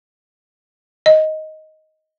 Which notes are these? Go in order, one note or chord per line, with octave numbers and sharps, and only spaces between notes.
D#5